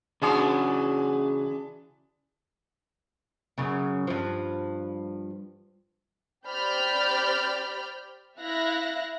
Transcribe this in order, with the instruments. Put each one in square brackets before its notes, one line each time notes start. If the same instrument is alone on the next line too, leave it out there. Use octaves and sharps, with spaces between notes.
[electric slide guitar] C#3 F#4 [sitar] E3 D4 G#4
[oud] F#2 C#3
G2 F3
[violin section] G4 C5 D5 B5 F6 G6
E4 E5 F5 F#6 A#6